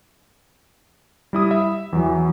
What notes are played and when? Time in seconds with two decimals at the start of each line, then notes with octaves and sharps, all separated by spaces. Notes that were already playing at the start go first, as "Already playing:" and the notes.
1.33 G3 E4 D#6
1.51 E5
1.93 E2 E3 F#3